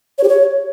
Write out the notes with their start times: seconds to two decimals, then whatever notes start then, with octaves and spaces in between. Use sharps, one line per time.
0.18 C#5
0.23 G4
0.29 C#5